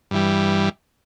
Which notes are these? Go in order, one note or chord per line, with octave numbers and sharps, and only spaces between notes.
G2 E3 G3